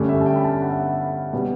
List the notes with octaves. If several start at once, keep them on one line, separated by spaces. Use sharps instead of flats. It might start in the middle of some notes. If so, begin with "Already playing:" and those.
Already playing: G2 D3 A3 C#4 D5
E5
A5
G5
B5
A5
F#5
E5
F#5
B2 G3 B3